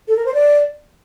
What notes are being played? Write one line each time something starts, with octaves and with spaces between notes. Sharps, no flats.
A4
A#4
C5
D5